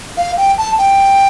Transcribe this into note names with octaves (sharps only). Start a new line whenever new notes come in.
F5
G5
A5
G5